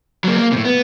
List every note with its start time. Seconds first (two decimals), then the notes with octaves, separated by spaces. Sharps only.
0.24 F#3 A#3
0.37 A#3
0.52 A2 C3
0.65 B3